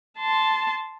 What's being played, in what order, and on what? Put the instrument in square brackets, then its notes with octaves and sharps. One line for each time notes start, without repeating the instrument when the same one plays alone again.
[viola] A5 C6